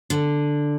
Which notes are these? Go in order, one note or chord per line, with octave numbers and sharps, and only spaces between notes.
D3